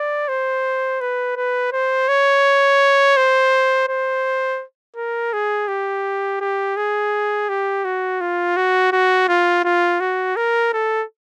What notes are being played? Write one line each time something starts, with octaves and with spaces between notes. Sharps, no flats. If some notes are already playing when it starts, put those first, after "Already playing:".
Already playing: D5
C5
B4
B4
C5
C#5
C5
C5
A#4
G#4
G4
G4
G#4
G4
F#4
F4
F#4
F#4
F4
F4
F#4
A#4
A4